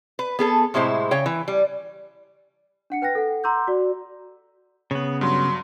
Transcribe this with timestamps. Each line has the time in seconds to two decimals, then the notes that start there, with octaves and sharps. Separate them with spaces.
0.19 B4
0.39 B3 G#4 A4
0.74 A2 C3 G#3 E4 C5
1.11 C#3 C#5 G5
1.26 E3
1.48 G3
2.90 D4 F#5 C#7
3.02 B4 G5 F#6 A#6
3.15 A4 F#5
3.44 F#5 A#5 C6 D6 E6 G6
3.68 F#4 D5
4.91 C#3 B3 C#5
5.21 G2 F#3 C6